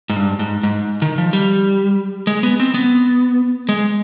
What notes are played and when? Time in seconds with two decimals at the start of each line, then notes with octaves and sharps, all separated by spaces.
0.10 G#2
0.16 G2
0.39 G#2
0.63 G#2
1.02 D#3
1.18 F3
1.33 G3
2.27 G#3
2.43 B3
2.60 C4
2.74 B3
3.69 G#3